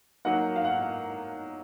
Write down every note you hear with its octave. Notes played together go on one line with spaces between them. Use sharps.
F#3 A#3 D#4 A#4 F#5
F5
F#5